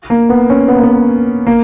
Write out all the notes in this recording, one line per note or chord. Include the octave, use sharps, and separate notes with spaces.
A#3
B3
C#4
B3
A#3
B3
A#3